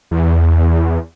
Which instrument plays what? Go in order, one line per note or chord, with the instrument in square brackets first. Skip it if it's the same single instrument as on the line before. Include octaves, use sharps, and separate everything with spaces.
[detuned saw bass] E2